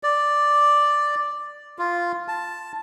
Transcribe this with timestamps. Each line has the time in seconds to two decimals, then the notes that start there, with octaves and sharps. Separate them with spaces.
0.03 D5
1.79 F4
2.28 A5